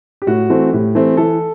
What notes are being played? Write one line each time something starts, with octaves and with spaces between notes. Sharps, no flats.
G4
A2 F#4
E3 A3 C4
A2 G4
E3 A3 C4
E3 A4